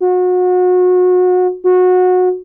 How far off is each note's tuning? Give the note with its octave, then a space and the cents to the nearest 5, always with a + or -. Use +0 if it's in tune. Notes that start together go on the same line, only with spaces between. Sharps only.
F#4 -30
F#4 -20